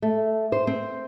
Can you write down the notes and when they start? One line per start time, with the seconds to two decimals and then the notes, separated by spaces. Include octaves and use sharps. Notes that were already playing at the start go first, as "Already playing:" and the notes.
0.02 A3
0.52 C5
0.67 C4